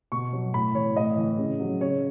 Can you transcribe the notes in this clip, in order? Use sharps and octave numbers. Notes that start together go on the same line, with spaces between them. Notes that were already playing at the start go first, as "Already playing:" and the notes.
B2 C#6
F#3
A2 B5
E3 C#5
A2 D#5
E3
C#3
F#3
C#3 C#5